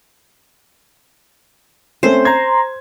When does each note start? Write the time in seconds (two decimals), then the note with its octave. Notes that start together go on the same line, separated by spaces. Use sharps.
2.03 A3 C4 C#4 C5
2.25 A#5 C6 G#6